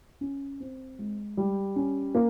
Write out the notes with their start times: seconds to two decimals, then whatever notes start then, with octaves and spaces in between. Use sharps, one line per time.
0.21 C#4
0.60 C4
0.99 G#3
1.37 G3
1.76 C#4
2.15 A#3